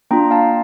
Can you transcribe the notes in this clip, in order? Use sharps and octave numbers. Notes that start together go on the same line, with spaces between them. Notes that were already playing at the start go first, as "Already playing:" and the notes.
A#3 D4 F4 G5 A#5
F5 A5